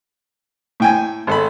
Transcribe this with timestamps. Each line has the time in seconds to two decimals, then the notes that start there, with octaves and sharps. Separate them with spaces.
0.80 A2 G5 G#5
1.27 G#1 A4 B5